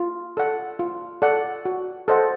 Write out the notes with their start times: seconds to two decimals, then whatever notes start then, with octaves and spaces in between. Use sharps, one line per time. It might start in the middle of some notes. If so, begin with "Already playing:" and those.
Already playing: F4
0.37 A4 D5 F#5
0.79 F4
1.22 A4 D5 F#5
1.65 F#4
2.08 A4 C5 D#5 F#5